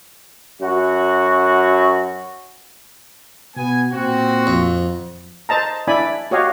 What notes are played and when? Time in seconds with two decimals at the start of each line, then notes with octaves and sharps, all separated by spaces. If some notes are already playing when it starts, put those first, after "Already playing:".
0.62 F#2 F#4
3.57 B2 B3 G#5
3.93 A#2 C4 F#4
4.47 F2
5.49 C5 D#5 A5 A#5
5.87 D4 E4 D5 G#5 B5
6.31 F#4 G4 C#5 D#5 F5